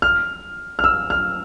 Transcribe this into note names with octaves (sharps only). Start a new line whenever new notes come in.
F6
F6
E6
F6